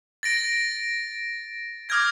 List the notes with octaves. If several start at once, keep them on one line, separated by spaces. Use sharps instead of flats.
A6 A#6 D7
D6 D#6 F6 G6 G#6 A#6